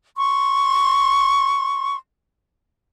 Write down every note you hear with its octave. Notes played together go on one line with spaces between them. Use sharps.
C6 C#6